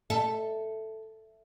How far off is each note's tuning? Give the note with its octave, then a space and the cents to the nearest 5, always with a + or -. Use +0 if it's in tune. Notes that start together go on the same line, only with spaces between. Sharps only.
A4 +0 E5 +5